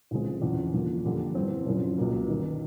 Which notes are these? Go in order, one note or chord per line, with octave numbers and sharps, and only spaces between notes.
D2 C#3 F3 G#3 C4
E2 C#3 F3
D3 F3 A#3
F2 D3 G3 A#3
G2 E3 G3 C4
F#1 F#2 C#3 F3
C#2 B2 F#3 A#3
G1 G2 D#3